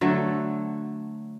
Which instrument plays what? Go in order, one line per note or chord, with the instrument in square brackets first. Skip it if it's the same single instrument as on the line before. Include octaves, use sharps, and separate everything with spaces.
[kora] D3 F#3 A3